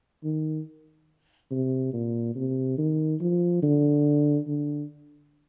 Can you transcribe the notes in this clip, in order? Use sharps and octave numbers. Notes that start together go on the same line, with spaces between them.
D#3
C3
A#2
C3
D#3
F3
D3
D3